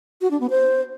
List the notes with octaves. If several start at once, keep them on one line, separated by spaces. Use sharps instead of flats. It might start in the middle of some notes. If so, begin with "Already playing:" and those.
F#4
D4
B3
C5